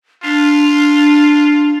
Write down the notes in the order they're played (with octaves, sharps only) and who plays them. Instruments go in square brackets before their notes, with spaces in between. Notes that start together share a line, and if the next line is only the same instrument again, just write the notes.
[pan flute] D4 [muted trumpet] F4